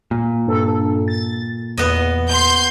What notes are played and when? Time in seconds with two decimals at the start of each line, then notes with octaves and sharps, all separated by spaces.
0.11 A#2
0.47 G2 A4
1.08 A6
1.77 E2 B3 D#5
2.29 C6 G6